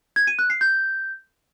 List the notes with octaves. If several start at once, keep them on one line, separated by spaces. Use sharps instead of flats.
G#6
D#7
F#6
C7
G6